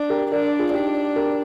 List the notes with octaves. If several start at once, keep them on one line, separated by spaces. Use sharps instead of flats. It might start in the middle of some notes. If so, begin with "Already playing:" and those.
Already playing: D4
G4 A#4
D4 A#4 D5
F4 G#4
D4 D#4 G4
G4 A#4